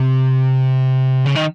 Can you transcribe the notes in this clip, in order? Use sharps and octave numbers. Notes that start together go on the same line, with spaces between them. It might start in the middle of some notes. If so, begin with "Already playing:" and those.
Already playing: C3
C#3
D#3